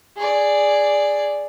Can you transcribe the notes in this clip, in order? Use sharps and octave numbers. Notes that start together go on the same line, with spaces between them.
G#4 D5